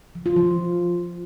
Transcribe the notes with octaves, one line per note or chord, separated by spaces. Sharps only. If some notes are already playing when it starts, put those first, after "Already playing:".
F3
F4
F3